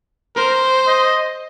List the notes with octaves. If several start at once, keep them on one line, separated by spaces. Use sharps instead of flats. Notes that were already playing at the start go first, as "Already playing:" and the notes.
A#4 C5
D#5